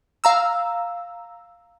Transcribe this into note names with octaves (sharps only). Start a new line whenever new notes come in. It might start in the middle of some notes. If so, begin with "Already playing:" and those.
F5 A#5 E6